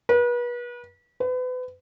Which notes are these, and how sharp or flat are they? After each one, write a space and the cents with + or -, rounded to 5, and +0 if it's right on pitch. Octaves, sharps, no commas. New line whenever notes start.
B4 -35
B4 +35